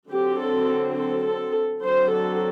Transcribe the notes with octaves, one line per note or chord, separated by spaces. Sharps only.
D3 F#3 C4 G4
A4
A4
A4
D3 F#3 C4 C5
A4